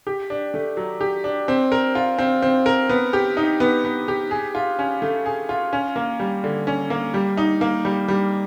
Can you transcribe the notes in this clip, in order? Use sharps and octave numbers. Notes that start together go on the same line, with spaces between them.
G4
D4
A3
F#3
G4
D4
C4
A#4
F4
C4
C4
A#4
B3
G4
D#4
B3
B3
G4
G#4
F4
C#4
A3
G#4
F4
C#4
A#3
G3
D3
C#4
A#3
G3
D#4
A#3
G3
G3